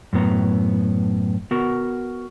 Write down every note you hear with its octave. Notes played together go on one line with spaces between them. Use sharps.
F#2 A2 B3 A#5
B3 F#4 A#4